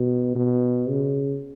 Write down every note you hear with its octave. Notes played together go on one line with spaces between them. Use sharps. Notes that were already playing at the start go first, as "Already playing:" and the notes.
Already playing: B2
B2
C#3